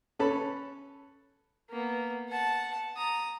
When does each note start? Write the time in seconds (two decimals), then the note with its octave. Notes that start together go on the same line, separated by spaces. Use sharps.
0.19 C#4 A4 B4 C#5 A5 B5
1.70 A#3 B3
2.29 F#5 A5
2.97 A#5 D#6